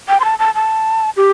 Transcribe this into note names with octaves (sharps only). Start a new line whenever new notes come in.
G5
C6
A5
A5
A5
G4